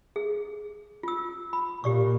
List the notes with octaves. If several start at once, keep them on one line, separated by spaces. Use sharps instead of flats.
G#4
F4 E6
B5
A#2 G4 D5 C#6